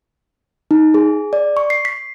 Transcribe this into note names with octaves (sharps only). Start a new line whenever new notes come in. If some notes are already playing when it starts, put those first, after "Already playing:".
D#4
G#4
D5
C#6
C7
B6